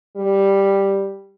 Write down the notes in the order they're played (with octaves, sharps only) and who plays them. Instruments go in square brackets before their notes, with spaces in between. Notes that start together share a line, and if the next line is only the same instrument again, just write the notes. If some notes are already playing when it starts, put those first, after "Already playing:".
[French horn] G3